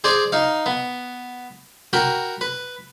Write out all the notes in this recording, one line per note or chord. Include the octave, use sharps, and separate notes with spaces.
G#4 C5 D5
D#4 F5
B3
F#4 A#4 G5 B5
B4